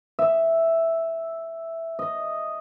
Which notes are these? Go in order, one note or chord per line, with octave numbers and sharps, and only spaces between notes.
E5
D#5